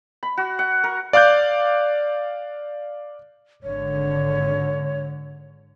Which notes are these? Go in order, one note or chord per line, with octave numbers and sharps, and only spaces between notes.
B5
F#4
F#5
A#4
D5 F5 D6 F#6 G6
G#1 D3 C#5